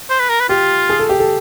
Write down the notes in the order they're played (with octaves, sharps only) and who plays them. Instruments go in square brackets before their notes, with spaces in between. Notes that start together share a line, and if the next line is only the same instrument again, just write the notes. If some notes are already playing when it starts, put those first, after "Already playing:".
[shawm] C5
B4
A#4
B4
[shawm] F4 [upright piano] G4
[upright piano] G#4
A4
G4
A4